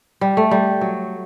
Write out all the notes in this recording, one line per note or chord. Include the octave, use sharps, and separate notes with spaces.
G3
A3
G3
F#3